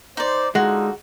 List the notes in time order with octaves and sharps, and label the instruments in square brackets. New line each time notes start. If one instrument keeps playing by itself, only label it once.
[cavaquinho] D#4 D5 [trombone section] C5
[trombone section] D3 D#4 F4 [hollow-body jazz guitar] G#3 [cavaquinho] F#4